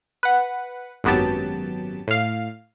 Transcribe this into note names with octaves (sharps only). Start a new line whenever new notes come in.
B4 F#5
G#1 F#2 F#3 B3 G4 A5
A2 F5